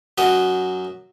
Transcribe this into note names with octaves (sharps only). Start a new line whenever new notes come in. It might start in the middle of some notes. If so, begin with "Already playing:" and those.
F#2 F#3 D#5